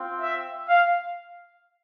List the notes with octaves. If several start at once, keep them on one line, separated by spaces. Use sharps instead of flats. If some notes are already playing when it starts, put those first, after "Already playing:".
Already playing: C4 F4
E5
F5